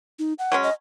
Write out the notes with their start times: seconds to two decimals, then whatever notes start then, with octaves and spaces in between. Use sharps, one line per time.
0.19 D#4
0.39 F#5
0.52 F#3 G#3 C#4
0.63 D#5